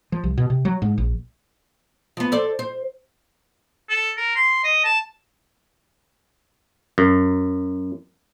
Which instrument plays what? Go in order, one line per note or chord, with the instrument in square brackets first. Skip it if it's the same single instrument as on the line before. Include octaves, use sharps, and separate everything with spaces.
[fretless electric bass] F3
C2
B2
C3
F#3
G#2
A#1
[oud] F3 B3
A4 C5 D5
C5
[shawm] A4
A#4
C6
D#5
A5
[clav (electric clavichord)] F#2